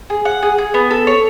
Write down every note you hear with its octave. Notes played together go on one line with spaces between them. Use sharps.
G#4
F#5
G#4
G#4
B3
A4
C#5